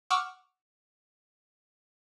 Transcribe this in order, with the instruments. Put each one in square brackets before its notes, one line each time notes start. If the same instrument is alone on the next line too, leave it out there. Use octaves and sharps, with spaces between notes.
[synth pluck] F#5 C#6 D6 E6 F6